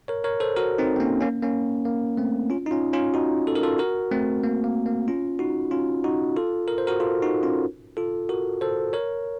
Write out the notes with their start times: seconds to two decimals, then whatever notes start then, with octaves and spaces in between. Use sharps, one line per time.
0.08 A#4 C#5
0.24 A#4 C#5
0.40 A4 C5
0.56 F#4 A#4
0.78 C4 D#4
0.96 C4
1.00 A#3 C#4
1.21 A#3 C#4
1.42 A#3 C#4
1.85 A#3
2.17 A3 C4
2.50 C#4 F4
2.66 D#4
2.71 C#4 F4
2.93 C#4 F4
3.14 D#4 F#4
3.47 A4
3.55 A#4
3.63 F4 A4
3.78 F#4 A#4
4.11 A3 C4
4.43 A#3
4.64 A#3
4.86 A#3
5.08 C#4 F4
5.39 D#4 F#4
5.71 C#4 F4
6.04 D#4 F#4
6.36 F4 A4
6.68 A#4
6.78 C5
6.87 F#4 A#4
7.00 F4 A4
7.22 D#4 F#4
7.43 C#4 F4
7.97 F4 A4
8.29 F#4 A#4
8.61 A4 C5
8.93 A#4 C#5